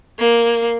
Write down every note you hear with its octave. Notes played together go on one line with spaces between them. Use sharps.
A#3